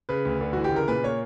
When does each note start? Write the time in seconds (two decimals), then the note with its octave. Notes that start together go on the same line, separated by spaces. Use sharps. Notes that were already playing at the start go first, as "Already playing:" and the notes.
0.09 C#3 B4
0.25 D2
0.41 D3
0.53 E3 F#4
0.64 G4
0.72 C#3 A#4
0.88 A#2 B4
1.04 A#3 C#5